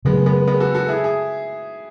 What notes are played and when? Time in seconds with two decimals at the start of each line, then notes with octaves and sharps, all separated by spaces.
0.05 C#3 F#3 G#3 A3 B3
0.26 G#3 B3
0.47 G#3 B3
0.60 F#4 A4
0.74 F#4 A4
0.88 E4 G#4
1.04 G#4